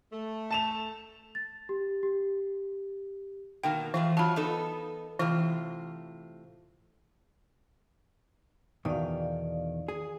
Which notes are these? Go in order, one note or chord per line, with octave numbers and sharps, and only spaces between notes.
A3
A5 E7 F7
A6
G4
G4
B2 D#3 A#3 G5
E3 F3 A3 F4
F#3 F4 A5 B5
B3 D#4 A4
A2 C3 E3 F4
E2 B2 D#3 D5 F5
G#4